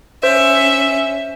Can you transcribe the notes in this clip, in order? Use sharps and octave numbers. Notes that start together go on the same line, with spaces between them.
C#4 C5 E5